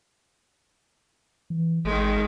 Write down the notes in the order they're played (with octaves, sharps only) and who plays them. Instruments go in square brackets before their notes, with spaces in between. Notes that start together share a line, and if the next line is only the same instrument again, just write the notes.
[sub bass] E3
[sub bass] G#1 [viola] D#3 G#3